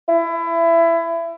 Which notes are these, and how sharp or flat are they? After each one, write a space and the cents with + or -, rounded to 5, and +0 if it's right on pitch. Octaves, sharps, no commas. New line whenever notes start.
E4 +25